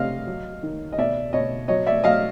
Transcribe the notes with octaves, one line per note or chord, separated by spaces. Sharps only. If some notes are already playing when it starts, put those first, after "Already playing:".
Already playing: C3 D#5 F5
F#3
D#3
D#5
B2 D5 E5
B2 C#5 D#5
F#3 C#5 D#5
D5 E5
F#3 D#5 F5